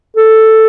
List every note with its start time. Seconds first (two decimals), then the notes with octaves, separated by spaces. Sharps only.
0.16 A4